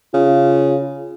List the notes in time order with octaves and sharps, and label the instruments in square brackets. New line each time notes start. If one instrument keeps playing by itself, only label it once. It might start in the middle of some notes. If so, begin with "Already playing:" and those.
[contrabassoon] C#3 [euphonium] F4